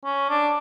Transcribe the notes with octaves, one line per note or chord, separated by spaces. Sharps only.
C#4
D4